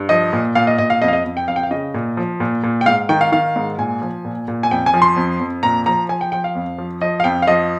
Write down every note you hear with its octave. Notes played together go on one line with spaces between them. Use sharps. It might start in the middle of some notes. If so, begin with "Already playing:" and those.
Already playing: G2
F3 D#5
A#2
A#2 F5
D#5
A#2 D#5
F5
F2 D#5
F5
D#5
F2
G5
F2 F5
G5
F5
C#3 D#5
A#2
F3
A#2
A#2
G5
G#2 F5
D#3 G5
F5
D#3 F5
G#2
A#2 G#5
F3
A#2
A#2
G#5
F2 G5
G#5
F3
C6
F2
F2
A#2 A#5
F3 A#5
F3 G#5
G5
F3 G5
F5
F2
F3
F3 D#5
F5
F2 G5
F5
F3 D#5